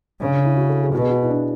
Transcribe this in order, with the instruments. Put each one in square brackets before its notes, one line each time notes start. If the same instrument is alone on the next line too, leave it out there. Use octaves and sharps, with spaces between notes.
[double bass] C#3 [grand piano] D4
[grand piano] D4
E4
F#4
A4
G#4
[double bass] B2 [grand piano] F#4
[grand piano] G#4
F#4
E4
D4